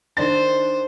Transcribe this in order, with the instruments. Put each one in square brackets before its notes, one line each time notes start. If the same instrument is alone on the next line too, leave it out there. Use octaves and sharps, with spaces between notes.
[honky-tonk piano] D#3 D4 A6 [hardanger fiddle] C5